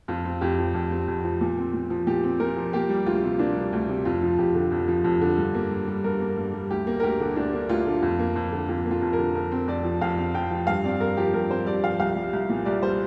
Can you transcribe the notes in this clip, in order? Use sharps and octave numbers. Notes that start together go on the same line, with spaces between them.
F2 F4
C4
F2 G4
F3
F2
C4
F2
F3
A#2
C4
A#2
F3
A#2 G4
C4
A#2 A#4
F3
A#3 G4
G3
D2 F4
C3
A#3 D4
G3
D2
C3
F2 F4
F3
F2 G4
D3
F2
F3
F2
D3
G2
A#3
G2
G3
G2 A#4
A#3
G2
G3
D2 G4
A#3
A#4
D2 G4
D3
D2 D4
A#3
D2 F4
D3
F2
A#3
F2
D3
F2 F4
A#3
F4
F2
A#4
D3
F2 A#4
C4
F2 D5
F3
F2 F5
C4
F2 G5
F3
G2 F5
C4 D5
G2 A#4
F3 G4
G2 A#4
C4 C5
G2 D5
F3 F5
C2 F5
G3
C2
A#2
C2 D5
G3 C5